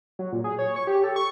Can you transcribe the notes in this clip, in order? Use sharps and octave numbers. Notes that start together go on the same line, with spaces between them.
F#3
A#2
G#4
C#5
C#6
G4
A4
C#6